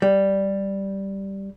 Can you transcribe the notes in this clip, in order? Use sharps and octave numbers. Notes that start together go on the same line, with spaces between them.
G3